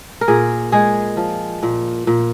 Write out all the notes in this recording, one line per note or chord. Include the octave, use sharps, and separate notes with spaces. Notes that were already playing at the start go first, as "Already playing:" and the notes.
A#4
A#2 G#4
G#3 G#4
F3
A#2
A#2